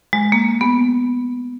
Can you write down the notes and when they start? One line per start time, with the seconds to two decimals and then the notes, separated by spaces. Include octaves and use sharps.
0.13 G#3
0.32 A#3
0.61 B3